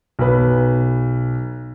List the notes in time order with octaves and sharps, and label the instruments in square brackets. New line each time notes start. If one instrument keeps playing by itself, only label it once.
[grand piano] B1 B4